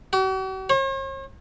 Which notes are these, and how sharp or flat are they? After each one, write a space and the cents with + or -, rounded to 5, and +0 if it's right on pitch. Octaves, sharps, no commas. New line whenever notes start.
F#4 +45
C#5 -45